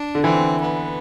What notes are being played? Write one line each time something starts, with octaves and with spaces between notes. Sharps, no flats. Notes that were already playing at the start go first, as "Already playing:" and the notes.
Already playing: D4
D3
E3 C4
B3